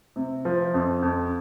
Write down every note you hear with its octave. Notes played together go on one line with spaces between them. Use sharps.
C3
F3
F2
F2